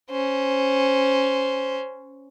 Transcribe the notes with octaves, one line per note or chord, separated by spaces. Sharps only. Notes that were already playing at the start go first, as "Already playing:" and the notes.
C#4 C5